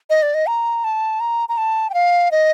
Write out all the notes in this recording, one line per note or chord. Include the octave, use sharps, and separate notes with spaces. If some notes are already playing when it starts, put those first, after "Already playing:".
D#5
D5
D#5
A#5
A5
A#5
A#5
A5
G5
F5
D#5